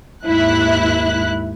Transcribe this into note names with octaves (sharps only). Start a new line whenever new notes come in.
D#2 G#2 E4 F#6